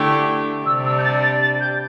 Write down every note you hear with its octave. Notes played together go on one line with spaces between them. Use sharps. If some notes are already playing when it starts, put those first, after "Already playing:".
Already playing: D3 A3 E4 G4
C3 G3 D4 E6
E6
G6
A6
A6
A6
G6